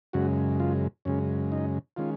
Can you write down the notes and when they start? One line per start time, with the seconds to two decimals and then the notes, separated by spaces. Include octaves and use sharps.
0.13 F#2 C#3 G#3 F#4
0.60 F4
1.05 F#2 C#3 G#3 C#4
1.52 D#4
1.97 D#3 G#3 C#4 F4